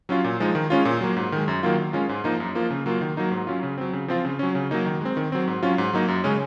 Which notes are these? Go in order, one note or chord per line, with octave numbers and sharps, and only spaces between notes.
F#3 C#4 F4
A#2
F3 G#3 D#4
D#3
G#3 C#4 F4
A#2
F#3 A#3
G#2
D#3 G#3
F#2
D#3 F#3 A#3 F4
D#3
G#3 C#4 F4
G#2
F3 A#3 D#4
F#2
F3 A#3 F4
C#3
F#3 A#3 F4
D#3
F#3 A#3 D#4
G#2
F#3 C#4 F4
C#3
F#3 C4
C#3
F3 C4 F4
C#3
F#3 C#4
C#3
F#3 A#3 D#4
D#3
G#3 C4
D#3
F#3 C4
G#2
F#3 C#4 F4
G#2
F#3 A#3 D#4
F#2
C#3 G#3 C#4